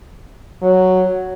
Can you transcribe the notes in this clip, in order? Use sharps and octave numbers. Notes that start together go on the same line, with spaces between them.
F#3